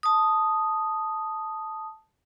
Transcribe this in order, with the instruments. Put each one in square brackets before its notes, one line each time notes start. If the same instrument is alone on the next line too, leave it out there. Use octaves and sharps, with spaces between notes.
[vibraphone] A5 D#6